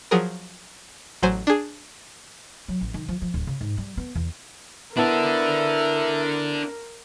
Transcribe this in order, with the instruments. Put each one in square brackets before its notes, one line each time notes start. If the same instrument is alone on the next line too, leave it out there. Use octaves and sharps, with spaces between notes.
[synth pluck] F3 F#3 G#4 A#4
A1 F#3 C5 G#5
D4 G#4
[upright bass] F#3
A1
D#3
F3
F3
D1
C#3
G#2
G3
B3
E2
[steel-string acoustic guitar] B3 E4 A5 [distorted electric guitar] D4 A4 [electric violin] A#4 [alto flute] E5